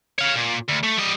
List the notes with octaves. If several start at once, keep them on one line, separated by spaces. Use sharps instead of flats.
C#5 F5
A#2
D2
A3
G3 D#5